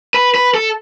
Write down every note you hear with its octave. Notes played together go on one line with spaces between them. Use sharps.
B4
B4
A4